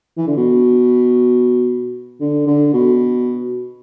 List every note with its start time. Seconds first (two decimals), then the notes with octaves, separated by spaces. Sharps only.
0.17 E3
0.27 D3
0.37 B2
2.21 D3
2.47 D3
2.74 B2